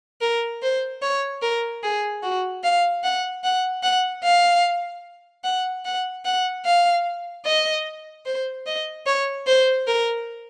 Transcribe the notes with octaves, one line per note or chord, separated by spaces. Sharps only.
A#4
C5
C#5
A#4
G#4
F#4
F5
F#5
F#5
F#5
F5
F#5
F#5
F#5
F5
D#5
C5
D#5
C#5
C5
A#4